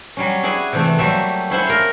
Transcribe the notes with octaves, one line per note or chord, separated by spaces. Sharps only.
F#3 G3 C#4
E4 G#4 D5 F#5 G#5
C3 E3 A3
F#3 G3 A3 A#3 E5
C#4 E4 C5 F#5
A#4 F5